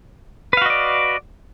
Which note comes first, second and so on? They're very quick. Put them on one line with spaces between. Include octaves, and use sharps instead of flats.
B4 F5 F#4 D#5 D5